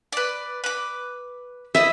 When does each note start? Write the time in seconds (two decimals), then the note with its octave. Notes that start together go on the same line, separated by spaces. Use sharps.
0.12 B4 D5
0.64 B4 D6
1.75 B3 E4 D#5 E5